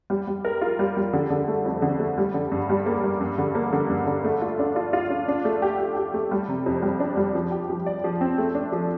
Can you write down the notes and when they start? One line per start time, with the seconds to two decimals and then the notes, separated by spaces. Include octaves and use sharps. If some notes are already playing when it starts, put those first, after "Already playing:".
0.10 G3
0.27 G3
0.45 A#4
0.61 F4
0.79 G3
0.97 G3
1.13 D3
1.30 D3
1.48 A3
1.65 F2
1.82 D3
2.00 A3
2.18 G3
2.34 D3
2.52 G2
2.69 G3
2.86 A#3
3.03 G3
3.21 G2
3.38 D3
3.55 A#3
3.73 D3
3.89 G2
4.07 D3
4.24 A3
4.41 F4
4.59 D4
4.76 F4
4.93 F4
5.10 D4
5.28 D4
5.45 A3
5.62 G4
5.79 G4
5.96 G4
6.14 A3
6.32 G3
6.48 C3
6.66 F2
6.82 G3
7.00 D4
7.17 G3
7.35 F3
7.52 G4
7.70 F3
7.86 D5
8.04 F3
8.21 C4
8.38 A3
8.55 D4
8.72 F3